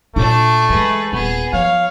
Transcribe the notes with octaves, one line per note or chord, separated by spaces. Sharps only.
A#2 A3 D4 E4 D6
E3 G#3 G#4 B4
D#1 B3 G#4
F3 C#5 F5